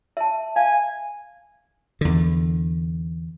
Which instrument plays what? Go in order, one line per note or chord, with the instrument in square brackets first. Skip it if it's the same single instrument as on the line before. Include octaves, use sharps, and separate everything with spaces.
[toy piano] E5 A5
[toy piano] F5 [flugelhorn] G#5
[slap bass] E2 D3